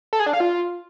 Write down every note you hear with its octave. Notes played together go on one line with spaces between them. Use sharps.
A4
G#4
D4
F5
F4